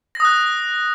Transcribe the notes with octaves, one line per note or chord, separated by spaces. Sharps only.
D#6 F#6 A#6